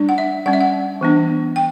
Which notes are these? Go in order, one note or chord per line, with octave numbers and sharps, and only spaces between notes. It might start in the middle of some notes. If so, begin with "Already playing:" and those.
Already playing: G3 D4
F#5
E5
G3 C#4 F#5
E5
F#5
E3 B3 D4
G5